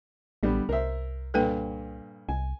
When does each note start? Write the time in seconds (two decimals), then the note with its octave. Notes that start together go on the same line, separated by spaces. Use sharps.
0.43 A1 D3 G3 B3
0.69 C2 A#4 C5 E5
1.34 G2 A#2 A4 B4 G5
2.29 C2 G#5